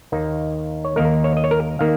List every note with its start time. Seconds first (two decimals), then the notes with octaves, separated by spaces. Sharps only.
0.12 D#2 D#3 A#3 D#4
0.84 C#5
0.96 D#2 D#3 A#3 D#4 A#4
1.24 C#5
1.37 D#5
1.44 C#5
1.51 A#4
1.79 D#3 A#3 F5